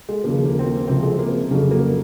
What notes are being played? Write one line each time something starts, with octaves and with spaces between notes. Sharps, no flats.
G#3
D#2 C#3 F3 A#3
A#3
C4
A#3
C#2 C3 F3 C4
G#3
A#3
F2 C#3 F#3
A#3